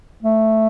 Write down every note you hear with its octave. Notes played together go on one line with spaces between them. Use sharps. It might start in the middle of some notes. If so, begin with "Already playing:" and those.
A3